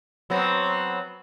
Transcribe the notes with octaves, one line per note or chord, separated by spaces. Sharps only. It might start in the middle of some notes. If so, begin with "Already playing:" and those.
F#3 B3 C4